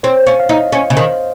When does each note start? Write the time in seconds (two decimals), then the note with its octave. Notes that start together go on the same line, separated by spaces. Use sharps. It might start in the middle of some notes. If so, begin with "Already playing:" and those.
0.03 C4 C#5
0.27 C#4 F5
0.40 F5
0.49 D#4 D#5
0.72 C#4 C5
0.90 C#3
0.96 D#3 C5